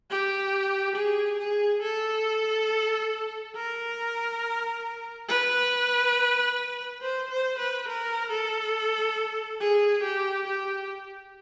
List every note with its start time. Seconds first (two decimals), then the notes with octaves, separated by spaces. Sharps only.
0.10 G4
0.96 G#4
1.40 G#4
1.82 A4
3.56 A#4
5.29 B4
7.01 C5
7.30 C5
7.58 B4
7.88 A#4
8.31 A4
9.60 G#4
10.03 G4
10.47 G4